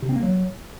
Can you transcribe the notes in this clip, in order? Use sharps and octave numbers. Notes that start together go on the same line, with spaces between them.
C3
C4
A#3
F#3